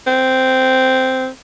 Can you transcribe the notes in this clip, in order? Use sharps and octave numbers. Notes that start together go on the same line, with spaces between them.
C4